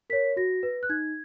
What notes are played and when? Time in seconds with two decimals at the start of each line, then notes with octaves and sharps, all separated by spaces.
0.10 A#4 C#5 B6
0.37 F#4 A#6
0.63 B4
0.83 F#6
0.89 D#4 G#6